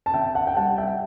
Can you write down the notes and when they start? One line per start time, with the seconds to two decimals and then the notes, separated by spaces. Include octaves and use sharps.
0.06 A5
0.14 C3 E5 G5
0.35 F#5 A5
0.47 G5
0.56 G3 F#5 A5
0.78 E5 G5